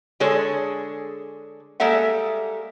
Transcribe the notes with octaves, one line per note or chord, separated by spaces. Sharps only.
D3 G#3 G#4 A4 C#5
G3 G#3 A#3 A4 E5 F#5